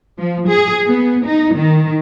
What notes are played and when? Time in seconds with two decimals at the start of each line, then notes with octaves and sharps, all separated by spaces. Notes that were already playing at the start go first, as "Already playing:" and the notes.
0.18 F3
0.48 G#4
0.86 B3
1.25 D#4
1.55 D#3